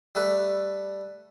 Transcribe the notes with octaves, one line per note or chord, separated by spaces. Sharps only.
G3 A3 A4 B4